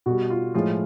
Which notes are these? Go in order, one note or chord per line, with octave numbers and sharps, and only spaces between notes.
B2 G3 F#4
F4
A2 F3 G#3 F4